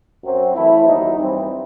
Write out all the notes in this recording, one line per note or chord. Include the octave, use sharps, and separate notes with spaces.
F#2 F#3 C4
E3 A3 E4
D#2 D#3 F#3 B3 D#4
G2 E3 G3 C4